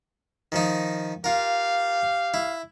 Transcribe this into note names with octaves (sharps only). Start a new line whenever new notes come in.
D#3 F3 D#4
F4 G4 A#4 F5
E4